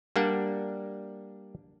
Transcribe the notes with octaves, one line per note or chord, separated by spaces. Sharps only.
G3 A#3 D4 F#5